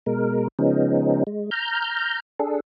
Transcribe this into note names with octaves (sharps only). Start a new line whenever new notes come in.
B2 G#3 A#4
C#3 F3 G#3 B3 C#4 D#4
G#3
A#5 F6 G6
D4 G#4 A4